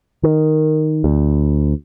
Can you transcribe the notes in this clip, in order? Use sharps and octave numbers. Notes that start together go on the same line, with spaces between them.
D#3
D2